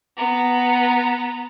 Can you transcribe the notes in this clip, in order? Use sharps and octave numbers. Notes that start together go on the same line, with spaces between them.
B3 A#5